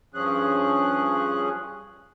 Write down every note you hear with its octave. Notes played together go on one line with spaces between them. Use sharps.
G2 F3 C#4 G#4 F#6